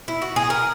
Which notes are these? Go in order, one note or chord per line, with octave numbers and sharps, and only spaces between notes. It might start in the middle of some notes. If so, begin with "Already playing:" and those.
E4
F#4
G#4
A#4